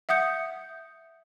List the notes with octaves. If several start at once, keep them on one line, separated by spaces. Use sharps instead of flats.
E5 F#5 D#6 G6 C#7